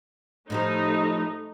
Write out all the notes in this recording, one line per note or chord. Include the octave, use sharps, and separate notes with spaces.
A2 F3 A3 D#4 G4